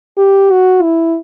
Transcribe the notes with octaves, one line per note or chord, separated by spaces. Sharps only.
G4
F#4
E4